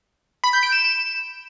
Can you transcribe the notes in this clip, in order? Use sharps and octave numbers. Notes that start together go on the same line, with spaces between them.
B5
G6
D7
E7